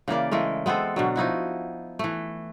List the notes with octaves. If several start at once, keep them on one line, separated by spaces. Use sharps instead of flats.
C#3 E3 A#3 D5
E3 G#3 A3 A#4
G#3 B3 C4 A4
B2 D3 F#3
F3 D#4 E4 F#4
E3 A3